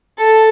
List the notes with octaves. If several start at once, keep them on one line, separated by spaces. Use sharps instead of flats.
A4